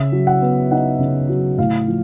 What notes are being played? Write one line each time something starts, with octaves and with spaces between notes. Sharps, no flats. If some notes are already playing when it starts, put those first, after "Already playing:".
Already playing: C#3 E5
F#3
F#5
B3
D#4 F#5
C#3
F#3
A2 F5
F3